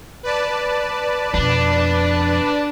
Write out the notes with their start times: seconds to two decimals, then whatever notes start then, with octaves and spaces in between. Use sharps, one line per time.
0.23 B4 D5 A5
1.34 F2 B2 D4